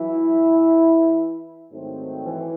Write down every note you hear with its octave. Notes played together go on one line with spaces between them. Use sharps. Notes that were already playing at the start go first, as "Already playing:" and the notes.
Already playing: E3 F#3 E4
G#2 D#3 F#3 A3 C4
E3 E4